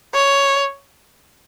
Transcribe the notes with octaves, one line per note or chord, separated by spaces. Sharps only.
C#5